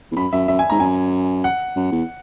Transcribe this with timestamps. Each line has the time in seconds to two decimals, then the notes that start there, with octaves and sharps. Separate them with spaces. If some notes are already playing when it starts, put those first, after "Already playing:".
0.12 E2
0.16 F#2 B5
0.33 F#2 E5
0.48 F#2 E5
0.59 G#5
0.70 G#2 A#5
0.80 F#2 G#5
1.44 F#5
1.76 F#2
1.92 E2